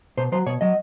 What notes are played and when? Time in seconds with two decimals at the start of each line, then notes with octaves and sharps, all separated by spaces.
0.17 B2 C5
0.32 F#3 C5
0.46 B2 C#5
0.61 F#3 D#5